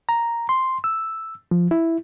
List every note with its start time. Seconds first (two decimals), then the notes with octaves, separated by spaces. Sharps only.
0.09 A#5
0.49 C6
0.84 E6
1.51 F3
1.71 E4